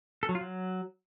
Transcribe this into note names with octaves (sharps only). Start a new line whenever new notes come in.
A4
F#3
F4
F#3